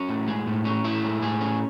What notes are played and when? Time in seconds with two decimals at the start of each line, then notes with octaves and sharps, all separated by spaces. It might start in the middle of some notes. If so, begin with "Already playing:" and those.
Already playing: C#4 F#4
0.09 A2
0.28 G#3
0.47 A2
0.65 C#4
0.84 A2 E4
1.04 G#3
1.22 A2 G#4
1.41 C#4